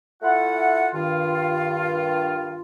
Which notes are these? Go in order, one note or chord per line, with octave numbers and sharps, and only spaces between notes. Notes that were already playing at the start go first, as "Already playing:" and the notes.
A3 E4 F4 F#5
G2 D#3 F4